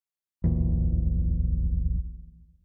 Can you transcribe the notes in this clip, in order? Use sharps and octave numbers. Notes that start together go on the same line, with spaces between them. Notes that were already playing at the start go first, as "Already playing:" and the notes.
D1 A#1 E2